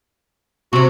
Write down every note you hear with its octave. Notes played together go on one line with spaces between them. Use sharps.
C3 C#4 F#4